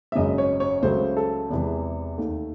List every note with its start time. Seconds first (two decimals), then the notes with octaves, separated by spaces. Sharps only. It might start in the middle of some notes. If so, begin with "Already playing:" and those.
0.12 E5
0.15 G#1 F#2 C#3 D#5
0.38 C#5
0.60 C#5
0.82 C#2 C#3 F#3 A3 C5
1.17 A4
1.50 E2 C3 E3 G#3
2.18 D#2 D#3 A3